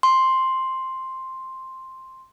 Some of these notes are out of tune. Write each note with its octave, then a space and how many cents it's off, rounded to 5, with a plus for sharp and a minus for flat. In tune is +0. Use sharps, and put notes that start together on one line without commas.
C6 +5